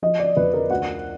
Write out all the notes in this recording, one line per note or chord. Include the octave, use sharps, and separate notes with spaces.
F3 D#5
D5
F2 B4
A#4
D2 F#5